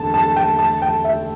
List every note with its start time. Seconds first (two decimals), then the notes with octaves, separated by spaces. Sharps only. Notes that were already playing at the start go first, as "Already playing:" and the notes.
Already playing: E2 D3 A3 A5
0.14 A5
0.36 G5
0.59 A5
0.82 G5
1.04 E5